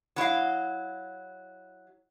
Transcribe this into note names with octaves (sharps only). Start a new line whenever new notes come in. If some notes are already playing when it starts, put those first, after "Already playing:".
F#3 E4 D#5 F5